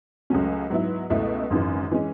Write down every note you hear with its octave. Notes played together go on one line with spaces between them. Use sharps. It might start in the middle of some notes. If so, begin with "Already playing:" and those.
C#2 C#3 F#3 A3 C#4
G#2 F#3 B3 E4
C#2 B2 A3 E4
G#1 F#2 C#3 E3
E3 G#3 C#4